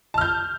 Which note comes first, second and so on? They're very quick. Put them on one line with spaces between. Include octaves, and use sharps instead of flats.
A5 F6 G6